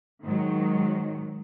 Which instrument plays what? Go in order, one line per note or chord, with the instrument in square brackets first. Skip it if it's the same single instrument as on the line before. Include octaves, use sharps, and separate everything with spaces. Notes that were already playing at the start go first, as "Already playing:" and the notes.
[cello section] G#2 D#3 F#3